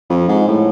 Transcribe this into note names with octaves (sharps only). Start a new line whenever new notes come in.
F2
G#2
A2